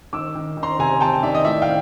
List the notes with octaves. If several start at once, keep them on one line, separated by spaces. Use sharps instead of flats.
D#3 D6 E6
D#3
D#3
A#5 C6
C3 G#5 A#5
C3 G5 A5
D#3 D5 E5
D#5
A2 D5 E5
F5 G5